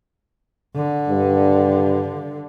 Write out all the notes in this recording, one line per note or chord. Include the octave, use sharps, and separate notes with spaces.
D3
G2